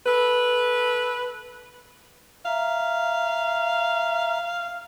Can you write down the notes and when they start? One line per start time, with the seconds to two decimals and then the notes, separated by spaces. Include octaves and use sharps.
0.06 A4 B4
2.45 E5 F5 A#5